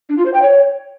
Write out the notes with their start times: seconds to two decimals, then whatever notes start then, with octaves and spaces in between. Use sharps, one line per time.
0.09 D4
0.17 F4
0.26 C5
0.34 G5
0.42 C#5